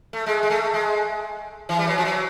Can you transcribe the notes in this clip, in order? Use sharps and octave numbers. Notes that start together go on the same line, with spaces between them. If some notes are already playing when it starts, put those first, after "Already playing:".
A3
G#3
G#3
A3
G#3
E3
G3
F#3
F3
F#3